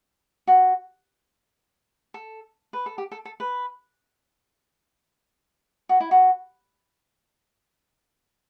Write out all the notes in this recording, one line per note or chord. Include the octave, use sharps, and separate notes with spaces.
F#4
A4
B4
A4
G4
A4
A4
B4
F#4
E4
F#4